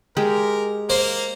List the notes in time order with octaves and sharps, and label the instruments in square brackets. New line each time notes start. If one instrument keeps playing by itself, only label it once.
[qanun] G#3 G4 [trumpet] A#4
[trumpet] A#3 [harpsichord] C5